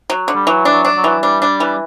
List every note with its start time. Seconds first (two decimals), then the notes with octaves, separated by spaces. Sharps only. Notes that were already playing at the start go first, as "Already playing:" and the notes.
0.10 F#3
0.28 D3
0.35 G3
0.47 E3 F#3
0.65 D4
0.72 F#3
0.85 D4
0.97 F#3
1.04 E3
1.22 G3 D4
1.42 D4
1.60 E3